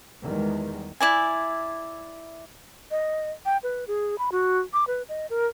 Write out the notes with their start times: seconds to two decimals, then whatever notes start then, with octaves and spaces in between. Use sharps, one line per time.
0.22 E2 D#3 G3 G#3
1.00 E4 D5 G#5
2.91 D#5
3.45 G5
3.63 B4
3.88 G#4
4.18 B5
4.32 F#4
4.73 D6
4.87 B4
5.09 D#5
5.30 A#4